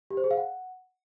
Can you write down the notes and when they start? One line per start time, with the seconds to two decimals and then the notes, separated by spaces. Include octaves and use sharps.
0.11 G4
0.17 C5
0.24 G#4
0.31 F5
0.37 F#5